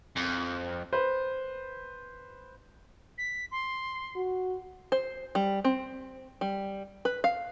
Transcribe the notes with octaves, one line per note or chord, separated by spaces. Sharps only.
F2
B4 C5
B6
C6
F#4
C5
G3
C4
G3
B4
F5